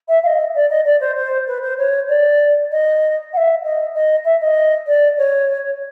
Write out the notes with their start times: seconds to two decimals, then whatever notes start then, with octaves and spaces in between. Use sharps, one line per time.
0.08 E5
0.23 F5
0.27 D#5
0.55 D5
0.70 D#5
0.85 D5
1.01 C5
1.16 C5
1.48 B4
1.63 C5
1.78 C#5
2.09 D5
2.72 D#5
3.33 F#5
3.37 E5
3.64 D#5
3.95 D#5
4.25 E5
4.41 D#5
4.87 D5
5.18 C#5